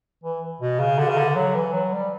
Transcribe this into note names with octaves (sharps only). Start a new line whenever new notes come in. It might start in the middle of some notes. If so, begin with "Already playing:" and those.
E3
B2
C#3
D3
C#3
D3
F#3
E3
F#3
G3